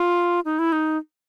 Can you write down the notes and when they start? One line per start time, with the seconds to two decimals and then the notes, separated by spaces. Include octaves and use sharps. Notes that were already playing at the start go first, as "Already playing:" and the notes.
Already playing: F4
0.45 D#4
0.59 E4
0.72 D#4